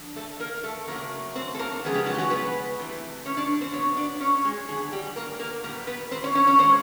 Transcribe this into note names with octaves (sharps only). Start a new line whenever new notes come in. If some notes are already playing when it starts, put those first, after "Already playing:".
Already playing: D3 F3
A3 A4
A#3 A#4
A3 A4
C#3 F#3 A3 A#3 A#4
C4 C5
A4
A#3 A#4
C#3 F3 G#3 B3 G#4
G3 G4
F#3 F#4
G4
F#3 F#4
B3 B4
C3 E3 A3
C#4 C#5
D4 D5
C4 C5
A#2 F#3 B3 C#5
D4 D5
C#4 C#5
G#3 G#4
D3 F#3 G#3 B3 G#4
G3 G4
A#3 A#4
A#3 A#4
A#2 G3 A#3 B3 A#4
B3 B4
C4 C5
C#4 C#5
C#4 C#5
C#4 C#5
A#2 F3 G#3 C4 C5